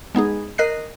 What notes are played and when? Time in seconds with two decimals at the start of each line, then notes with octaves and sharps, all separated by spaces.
0.15 G#3 B3 D#4 G#4
0.58 A#4 D#5 F#6 C7